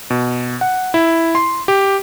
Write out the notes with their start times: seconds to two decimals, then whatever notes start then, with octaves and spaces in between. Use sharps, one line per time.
0.10 B2
0.61 F#5
0.94 E4
1.35 C6
1.68 G4